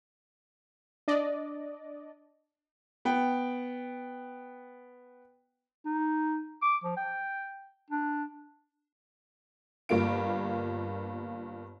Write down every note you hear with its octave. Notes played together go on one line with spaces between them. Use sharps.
D4 D5 D#5
B3 G5
D#4
D6
F3
G5
D4
G1 G2 A#3 F4 D7